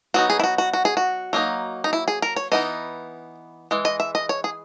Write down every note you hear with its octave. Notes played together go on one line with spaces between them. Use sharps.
F#3 B3 D#4 F#4
G#4
E4
F#4
F#4
F#4
G#4
F#4
F#3 A#3 D#4
D#4
E4
G#4
A#4
C#5
E3 B3 D#4 D#5
E3 G#3
D#5
E5
D#5
C#5
G#4